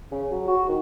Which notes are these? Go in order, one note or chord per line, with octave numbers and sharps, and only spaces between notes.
C#3
F#3
F#4
D#3